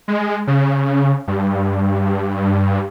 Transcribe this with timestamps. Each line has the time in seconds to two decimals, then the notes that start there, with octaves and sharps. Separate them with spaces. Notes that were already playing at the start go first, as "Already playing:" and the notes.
0.08 G#3
0.47 C#3
1.27 G2